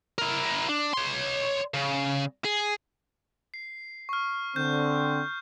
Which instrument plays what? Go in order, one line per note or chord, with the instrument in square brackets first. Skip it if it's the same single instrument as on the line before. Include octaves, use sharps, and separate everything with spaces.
[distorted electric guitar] E4 A#4
D4
C#5 C6
C#3
G#4
[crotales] C7
C#6 F6
[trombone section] D3 C4 [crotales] G6